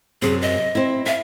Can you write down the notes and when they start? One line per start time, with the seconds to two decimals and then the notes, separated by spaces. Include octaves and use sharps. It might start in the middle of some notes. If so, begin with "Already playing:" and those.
0.22 F#2 C3 G#4
0.42 D#5
0.75 C4 E4
1.06 E5 F5